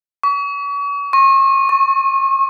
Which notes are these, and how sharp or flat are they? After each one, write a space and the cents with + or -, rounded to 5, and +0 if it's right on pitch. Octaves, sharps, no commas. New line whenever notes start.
C#6 +40
C#6 -40
C#6 -25